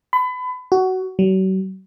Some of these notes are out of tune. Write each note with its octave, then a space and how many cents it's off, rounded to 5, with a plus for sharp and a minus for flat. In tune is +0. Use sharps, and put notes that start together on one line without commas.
B5 +30
F#4 +15
F#3 +40